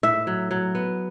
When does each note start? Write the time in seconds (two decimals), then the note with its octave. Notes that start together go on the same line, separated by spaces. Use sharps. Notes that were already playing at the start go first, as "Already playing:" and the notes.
0.03 A2 E5
0.27 F#3
0.51 F#3
0.75 B3